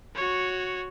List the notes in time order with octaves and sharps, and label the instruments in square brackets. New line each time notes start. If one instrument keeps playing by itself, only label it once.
[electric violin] F#4 C#5